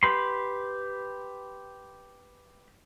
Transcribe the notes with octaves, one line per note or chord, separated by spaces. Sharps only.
G4 B4 B5 C6